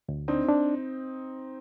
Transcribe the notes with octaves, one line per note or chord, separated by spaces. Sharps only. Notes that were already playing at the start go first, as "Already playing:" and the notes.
D2
C4 D4 D#4
D4